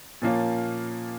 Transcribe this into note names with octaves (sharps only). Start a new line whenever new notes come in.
A#2 F3 A#3 C#4